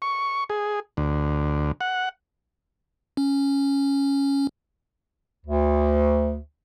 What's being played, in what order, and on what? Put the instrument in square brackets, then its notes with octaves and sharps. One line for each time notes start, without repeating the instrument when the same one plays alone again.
[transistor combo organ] C#6
G#4
D2
F#5
[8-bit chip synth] C#4
[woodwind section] D2